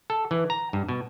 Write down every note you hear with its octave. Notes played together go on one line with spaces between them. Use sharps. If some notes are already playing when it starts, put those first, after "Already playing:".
A4
E3
A#5
G2
B2